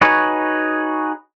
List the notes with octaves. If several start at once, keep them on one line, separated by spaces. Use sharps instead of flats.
D#4 F#4 G#4 B4 C#5